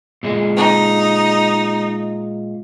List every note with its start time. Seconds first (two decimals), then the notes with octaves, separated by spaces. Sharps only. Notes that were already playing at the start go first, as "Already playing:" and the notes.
0.23 A#2 G#3
0.57 D#4